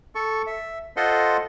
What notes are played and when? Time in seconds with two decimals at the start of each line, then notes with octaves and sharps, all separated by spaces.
0.15 A4 C#6
0.47 E5
0.97 F4 A4 C5 D#5 F#5 C6